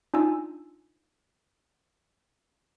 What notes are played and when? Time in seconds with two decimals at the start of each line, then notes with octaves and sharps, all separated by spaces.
0.14 D4 D#4 F4 G#5 E6